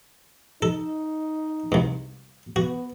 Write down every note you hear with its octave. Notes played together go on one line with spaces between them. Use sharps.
D#4 A4
C2 G2
B3 F#4